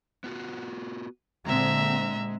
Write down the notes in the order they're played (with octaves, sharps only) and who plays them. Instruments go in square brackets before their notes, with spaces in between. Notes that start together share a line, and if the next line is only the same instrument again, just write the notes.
[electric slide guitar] B3 F4 F#4
[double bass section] A#2 D3 C4 [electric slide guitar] G#3 [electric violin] E5 A#5